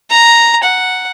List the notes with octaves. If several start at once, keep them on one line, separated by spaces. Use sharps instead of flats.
A#5
F#5